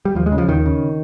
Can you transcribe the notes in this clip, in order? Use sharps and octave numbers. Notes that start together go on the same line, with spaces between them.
G3
D#2 F3
G#3
C#3
F3
D#2 D#3
C#3